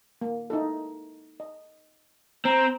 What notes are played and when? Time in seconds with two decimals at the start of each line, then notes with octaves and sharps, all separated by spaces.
0.21 A#3
0.50 D#4 E4 A4
1.40 D#5
2.45 C4 A#5